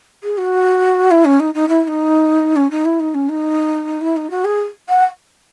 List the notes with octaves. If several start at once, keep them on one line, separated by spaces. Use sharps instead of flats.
G#4
F#4
E4
C#4
D#4
D#4
E4
E4
D#4
C#4
D#4
E4
D#4
C#4
D#4
E4
D#4
F#4
G#4
F#5